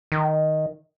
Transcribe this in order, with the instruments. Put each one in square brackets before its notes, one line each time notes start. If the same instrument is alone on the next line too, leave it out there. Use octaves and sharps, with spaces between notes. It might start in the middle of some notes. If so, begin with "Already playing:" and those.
[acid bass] D#3